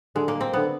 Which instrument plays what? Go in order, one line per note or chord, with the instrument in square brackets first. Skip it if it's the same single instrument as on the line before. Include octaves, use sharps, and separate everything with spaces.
[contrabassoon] D3 [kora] G#3
[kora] A#3
C4
[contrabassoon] D3 [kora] B3